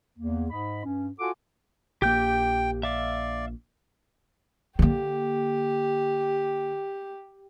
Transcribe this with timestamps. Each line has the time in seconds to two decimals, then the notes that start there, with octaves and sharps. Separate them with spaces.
0.18 E2 A#3
0.50 G#2 D#5 B5
0.85 G2 C#4
1.19 F4 F#4 A4 F#5 G#5 D6
2.02 A#1 A#3 G4 G5 G6
2.83 D5 E5 F5
4.79 D3 A#3 G4